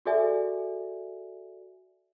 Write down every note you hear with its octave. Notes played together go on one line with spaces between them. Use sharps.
F#4 G#4 A4 D5 E5 G#5